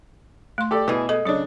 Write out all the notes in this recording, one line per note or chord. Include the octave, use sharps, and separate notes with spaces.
A3 C6
G4 A4 D5
B2 E3 G#4
G#3 A4
C#3 F#3 D4 C#5